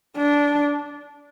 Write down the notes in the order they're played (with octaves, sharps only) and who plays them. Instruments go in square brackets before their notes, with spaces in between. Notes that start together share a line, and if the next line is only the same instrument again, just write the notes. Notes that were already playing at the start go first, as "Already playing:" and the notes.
[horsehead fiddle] D4